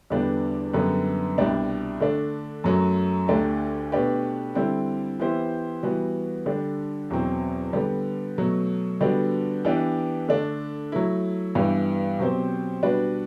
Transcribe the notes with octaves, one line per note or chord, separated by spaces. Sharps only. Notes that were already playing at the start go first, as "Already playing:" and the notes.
E2 D3 G3 B3 D4
F#2 D3 G3 B3
C2 B2 G3 D4
D3 A3 D4
F#2 F#3 A3
D2 D3 A3 D4 G4
B2 A3 D4 G4 B4
D3 G3 C4 E4
E3 B3 E4 G4 C5
E3 G3 B3 F#4
D3 G3 D4
E2 B2 F#3 C4
D3 G3 B3
B2 F#3 A3
D3 G3 B3 D4 F#4
E3 B3 D4 G4
D3 A3 D4
F#3 A3 E4
G2 E3 G3 B3
B2 F#3 C4 G4 C5
B2 G3 D4 F#4 B4